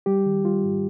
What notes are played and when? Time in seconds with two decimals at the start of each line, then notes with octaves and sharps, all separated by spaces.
0.06 G3 G4
0.26 D#3
0.45 G3 F4
0.64 G#2